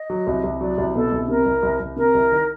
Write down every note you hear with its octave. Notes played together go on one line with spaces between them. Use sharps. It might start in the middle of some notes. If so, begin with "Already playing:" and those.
Already playing: D#5
F#3
C2
C2
F#3 D5
C2
B2 A4
C2
C3 A#4
C2
C2
C2
C3 A#4
C2
D#3